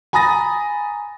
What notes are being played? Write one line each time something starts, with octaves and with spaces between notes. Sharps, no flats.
G#5 A#5 B5 D#6 A6 A#6